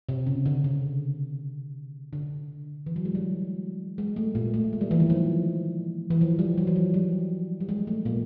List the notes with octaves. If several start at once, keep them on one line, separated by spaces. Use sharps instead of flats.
C3
C#3
D3
C#3
D3
E3
F#3
G#3
G3
G#3
A3
A#2 A#3
A3
G#3
G3
E3
D#3
F3
E3
F3
G3
F#3
E3
F3
G3
G3
G#3
A3
A#2 A#3